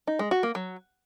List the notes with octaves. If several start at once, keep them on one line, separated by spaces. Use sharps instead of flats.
D#4
G#3
F#4
A#3
F#3